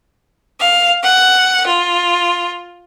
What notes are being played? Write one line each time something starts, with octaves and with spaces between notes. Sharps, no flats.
F5
F#5
F4